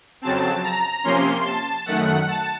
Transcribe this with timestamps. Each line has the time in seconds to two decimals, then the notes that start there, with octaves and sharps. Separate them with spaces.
0.22 F2 C#3 F#3 C4 A5
0.64 A#5
1.04 C3 F3 A#3 C#4 C6
1.45 A5
1.86 F#2 D#3 A3 F#5
2.27 A5